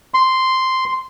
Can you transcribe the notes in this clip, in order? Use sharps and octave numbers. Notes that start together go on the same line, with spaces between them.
C6